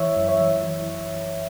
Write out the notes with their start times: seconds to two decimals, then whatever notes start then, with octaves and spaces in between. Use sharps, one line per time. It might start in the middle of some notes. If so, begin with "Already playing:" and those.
Already playing: E3 C#5 E5
0.16 F#2
0.28 C#5 E5
0.41 E3
0.63 E3